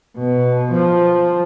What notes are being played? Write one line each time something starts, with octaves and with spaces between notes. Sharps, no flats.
B2
F3